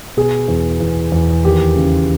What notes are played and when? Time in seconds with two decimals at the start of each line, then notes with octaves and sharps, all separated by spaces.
0.17 B2 G#4
0.48 E2
0.80 E2
1.12 E2
1.45 D#2 G4
1.76 C#3